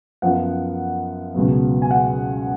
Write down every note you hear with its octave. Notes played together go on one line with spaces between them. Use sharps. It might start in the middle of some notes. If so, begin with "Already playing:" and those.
F#2 F3 B3 F#5
C#2 B2 F#3 B3
G#5
F#5